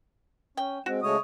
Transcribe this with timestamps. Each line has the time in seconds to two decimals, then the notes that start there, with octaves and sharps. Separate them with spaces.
0.57 C#4 G5
0.86 G#3 C4 F#4
1.03 C#3 G#3 A3 C#5 D#6